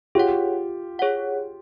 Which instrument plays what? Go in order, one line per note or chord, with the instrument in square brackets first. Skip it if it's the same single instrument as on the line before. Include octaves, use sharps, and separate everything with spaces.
[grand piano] F4 G4 [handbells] G#4 C#5 F#5
[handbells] G#4 C#5 F#5